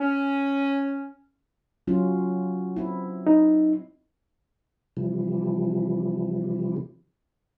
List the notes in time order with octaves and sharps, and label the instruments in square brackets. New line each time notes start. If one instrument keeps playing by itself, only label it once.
[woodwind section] C#4
[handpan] F#3 C#4 F4
C4 E4
[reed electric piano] D#4
[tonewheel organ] C3 E3 F3 G3